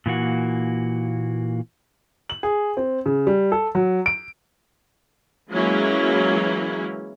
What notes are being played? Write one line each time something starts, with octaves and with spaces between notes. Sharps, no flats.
A#2 E3 A#3 F#4
F#7
G#4
C4
C#3
G3
A4
F#3
D7
E3 F#3 G#3 A#3 C#4 E4